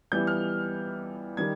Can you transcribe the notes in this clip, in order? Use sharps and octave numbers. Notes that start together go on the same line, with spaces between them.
E3 G3 B3 G6
F6
D#3 G3 G#6